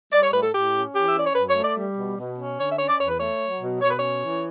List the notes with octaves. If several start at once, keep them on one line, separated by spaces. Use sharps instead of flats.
G3 D5
C#5
A2 B4
A4
A2 G4
C#4
E3 G4
E5
C#4 D5
C#5
F#2 B4
C#5
A3
D5
G3
B2
B2
C#4
D3 C#5
E5
C#4 C#5
D5
E2 C#5
B4
A3 C#5
F#3
B2
B2 C#5
B4
C#4 C#5
E3